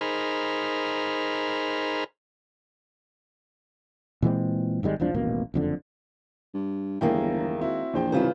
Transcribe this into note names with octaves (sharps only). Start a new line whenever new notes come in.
D#4 G#4 A#4 C5 B5 F6
A#2 E3 G#3 C4
G#1 D#3 G3 G#3
E1 C2 F3 D4
D#1 A1 B2 A#3
F#1 F2 D3
G2
G1 E2 D#3 G#3 A#3 E4 G5
C4 E4 F#4
A#1 E2 C5 G5
C2 G#2 C#3 E3 B3 F4 C5